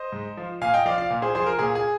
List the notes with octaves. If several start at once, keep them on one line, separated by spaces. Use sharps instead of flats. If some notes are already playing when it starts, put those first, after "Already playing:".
Already playing: C5 D#5
G#2
F3
A#2 F5 G#5
D#5 G5
F3 D5 F5
D5 F5
A#2
G#4 C5
F3 G#4 C5
A#4
A#2 G#4
G#4